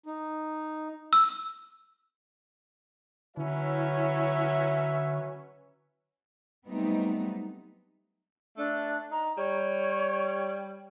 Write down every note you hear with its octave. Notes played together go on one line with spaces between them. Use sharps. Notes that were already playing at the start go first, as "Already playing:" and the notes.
D#4
E6
D3 E3 F#3 C#4 E4 B4 C#5 E5
F#3 G3 A3 B3 C4 D#4
A3 D4
D#4 A#5
G3 C#5